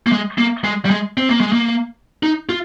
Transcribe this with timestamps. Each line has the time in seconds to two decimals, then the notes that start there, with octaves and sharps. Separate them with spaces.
0.06 A#3
0.12 G#3
0.38 A#3
0.64 G#3
0.85 G3
0.90 G#3
1.17 C4
1.29 A#3
1.41 G#3
1.52 A#3
2.23 D#4
2.49 F4